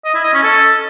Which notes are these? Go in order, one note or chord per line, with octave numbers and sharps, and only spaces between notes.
D#5
E4
D#5
C#4
A4